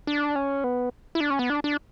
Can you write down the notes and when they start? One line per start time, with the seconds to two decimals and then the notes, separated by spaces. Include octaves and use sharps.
0.07 D4
0.36 C#4
0.64 B3
1.15 E4
1.21 D4
1.30 C#4
1.39 B3
1.50 D4
1.64 D4